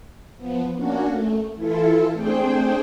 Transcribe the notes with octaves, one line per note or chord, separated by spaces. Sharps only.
F3 B3
A#3 C#4 D4 F#4
A3
E3 E4 F4 A4
A3 C4 D4 G#4 C5 G5